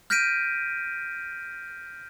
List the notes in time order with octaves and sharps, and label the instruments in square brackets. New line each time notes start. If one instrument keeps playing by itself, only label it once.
[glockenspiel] F6 G6 A#6 B6 D7 D#7